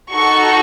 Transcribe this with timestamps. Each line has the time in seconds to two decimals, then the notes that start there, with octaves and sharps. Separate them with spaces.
0.11 D#4 F#4 A4 C#6